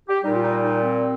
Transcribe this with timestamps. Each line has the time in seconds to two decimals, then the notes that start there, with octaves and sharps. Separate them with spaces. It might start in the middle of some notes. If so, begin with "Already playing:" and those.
0.09 G4
0.23 A#2 G3 D#4
0.34 F4
0.43 D#4
0.63 D#4
0.82 C4